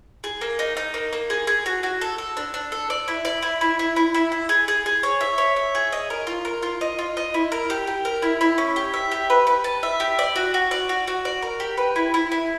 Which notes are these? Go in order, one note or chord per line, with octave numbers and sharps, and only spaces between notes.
G#4
A#3
D#4
D#4
A#3
A#3
G#4
G#4
F#4
F#4
A4
A4
D4
D4
A4
D5
E4
D5
E4
E4
E4
E4
E4
E4
G#4
G#4
G#4
C#5
E5
C#5
E5
G#4
D#5
A#4
F4
A#4
F4
D#5
F4
D#5
E4
A#4
G4
G4
A#4
E4
E4
C#4
G4
E5
G4
B4
B4
A5
E5
G4
D5
F#4
F#4
D5
F#4
F#4
D5
A#4
G4
B4
E4
E4
E4